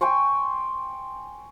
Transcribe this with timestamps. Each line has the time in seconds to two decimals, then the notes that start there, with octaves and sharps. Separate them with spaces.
0.01 G5 G#5 C6 C#6